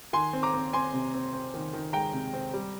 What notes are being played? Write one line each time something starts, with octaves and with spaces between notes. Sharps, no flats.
D#3 G#5 C6
C4
A#5 D6
C4
C4 G#5 C6
C3
C4
C4
D#3
D#3
G#3 G5 A#5
C3
C4
G3